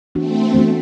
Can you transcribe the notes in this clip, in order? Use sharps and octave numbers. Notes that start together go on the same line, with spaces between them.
E3 A3 B3 C4 D4 F#4
E3 B3 D4 F#4